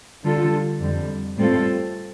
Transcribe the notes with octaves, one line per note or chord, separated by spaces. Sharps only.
D3 G3 F4 A4
F2 D3 G3
A2 G3 C4 F4 A4